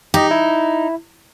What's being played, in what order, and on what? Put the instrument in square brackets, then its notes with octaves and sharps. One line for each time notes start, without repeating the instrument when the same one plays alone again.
[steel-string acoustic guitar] D#4 [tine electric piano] G4 D#5
[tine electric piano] E4